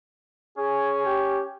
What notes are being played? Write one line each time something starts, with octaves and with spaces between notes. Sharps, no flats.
C#4 G#4
G4